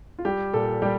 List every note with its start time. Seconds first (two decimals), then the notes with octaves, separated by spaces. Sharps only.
0.19 F4
0.25 G3 G4
0.54 A#2 A4
0.82 G3 G4